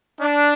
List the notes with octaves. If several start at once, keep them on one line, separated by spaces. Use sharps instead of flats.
D4